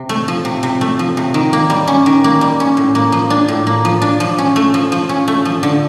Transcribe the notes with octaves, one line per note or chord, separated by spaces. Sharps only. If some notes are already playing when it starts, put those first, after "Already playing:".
Already playing: C3
A3
F3
C3
C3
A3
F3
C3
D#3
A#3
G3
C#4
D#3
A#3
G3
C#4
A2
A#3
F3
D4
A2
A#3
F3
D4
F3
C#4
A3
F3
F3
C#4
A3
F3
D3